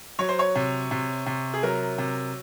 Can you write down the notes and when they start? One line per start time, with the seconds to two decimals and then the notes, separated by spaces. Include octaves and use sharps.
0.19 F#3 C#5
0.29 C5
0.39 C#5
0.55 C3
0.91 C3
1.26 C3
1.54 G#4
1.63 F#3 A#4
1.98 C3